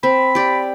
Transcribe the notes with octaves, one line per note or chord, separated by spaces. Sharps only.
C4 B5
G4 D5